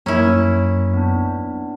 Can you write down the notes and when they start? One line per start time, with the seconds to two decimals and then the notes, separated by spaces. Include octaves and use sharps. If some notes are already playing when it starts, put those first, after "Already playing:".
0.06 F#2 A#3 C#4 E4 A#4
0.94 B3 D4